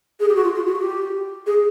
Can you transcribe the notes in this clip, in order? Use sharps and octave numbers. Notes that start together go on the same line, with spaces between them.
G#4
G4
F#4
F4
F4
F#4
G#4
G4
G#4